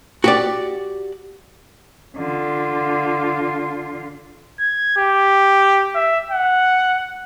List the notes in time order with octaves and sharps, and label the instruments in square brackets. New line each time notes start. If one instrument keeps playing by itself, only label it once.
[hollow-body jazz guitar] F#4 G4 D5
[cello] D3 F4
[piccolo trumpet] G#6
G4
E5
F#5